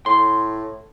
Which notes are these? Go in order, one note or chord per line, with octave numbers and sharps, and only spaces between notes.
A2 C6